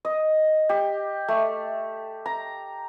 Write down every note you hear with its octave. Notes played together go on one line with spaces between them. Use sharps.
D#5
G4
A3
A#5